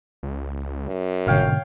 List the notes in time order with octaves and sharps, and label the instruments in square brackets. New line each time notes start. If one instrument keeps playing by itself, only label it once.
[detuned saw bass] C#2
[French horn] F#2
[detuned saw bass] G1 [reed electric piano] G#2 B2 D3 [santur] C#5 F5 G5